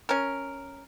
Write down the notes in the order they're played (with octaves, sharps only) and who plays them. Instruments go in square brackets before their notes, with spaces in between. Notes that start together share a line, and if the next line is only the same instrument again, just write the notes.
[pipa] C#4 A#4